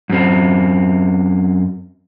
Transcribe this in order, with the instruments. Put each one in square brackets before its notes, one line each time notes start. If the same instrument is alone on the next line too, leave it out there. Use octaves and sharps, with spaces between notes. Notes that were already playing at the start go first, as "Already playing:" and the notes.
[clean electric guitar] F#2 C4